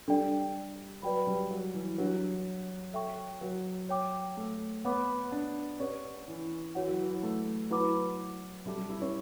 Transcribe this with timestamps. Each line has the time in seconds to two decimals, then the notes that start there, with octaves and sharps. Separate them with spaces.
0.08 G3 D4 A4 D5 G5
1.02 F#3 B4 D5 G5 B5
1.27 G3
1.51 F#3
1.74 E3
1.98 F#3 D4 G4 C#5 F#5
2.93 A4 E5 G5 C#6
3.41 F#3
3.89 C#5 G5 D6
4.37 A3
4.85 B3 C#5 F#5 B5 D6
5.32 D4
5.80 C#4 G4 B4 D5 F#5
6.28 E3
6.75 E3 F#4 C#5 F#5
6.88 F#3
6.99 E3
7.23 A3
7.70 F#3 E4 B4 F#5 B5 D6
8.66 G3 F#4 A4 E5 A5 D6
8.78 G3
8.89 E4
9.01 C#4